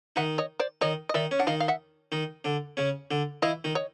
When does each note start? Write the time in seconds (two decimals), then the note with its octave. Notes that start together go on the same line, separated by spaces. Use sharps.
0.16 D#3 D#4 E5 F#5
0.38 C#5 D#5
0.60 C5 D5
0.81 D#3 D#4 C#5 D#5
1.09 D#5
1.14 D#3 D#4 D5 E5
1.31 C#4
1.39 D4 F#5
1.47 D#3 D#4 D#5 F5
1.60 F5
1.68 E5 F#5
2.12 D#3 D#4
2.44 D3 D4
2.77 C#3 C#4
3.11 D3 D4
3.42 E3 E4 D#5 F5
3.64 D#3 D#4
3.75 C#5 D#5